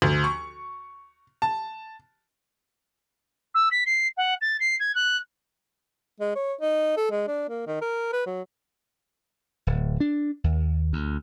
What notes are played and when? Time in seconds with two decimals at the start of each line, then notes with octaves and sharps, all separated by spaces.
0.02 D2
0.24 C#6
1.42 A5
3.54 E6
3.71 B6
3.86 C7
4.17 F#5
4.41 A6
4.60 C7
4.79 G#6
4.95 F#6
6.20 G#3
6.36 C#5
6.61 D#4
6.97 A4
7.11 G#3
7.28 D4
7.49 A#3
7.67 D#3
7.81 A#4
8.12 B4
8.26 F#3
9.67 D1
10.00 D4
10.44 D#2
10.93 D2